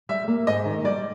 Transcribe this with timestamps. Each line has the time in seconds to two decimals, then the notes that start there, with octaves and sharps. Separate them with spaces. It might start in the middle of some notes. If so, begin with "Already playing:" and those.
0.09 G3 E5
0.28 A#3
0.47 G#2 D#5
0.65 D#3
0.84 G3 D5